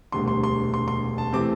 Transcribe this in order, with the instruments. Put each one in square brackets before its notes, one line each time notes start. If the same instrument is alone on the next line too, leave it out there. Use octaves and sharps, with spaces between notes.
[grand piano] E1 D2 C3 G3 C6
C6
C6
C6
C6
A5
C3 E3 A3 C4 D6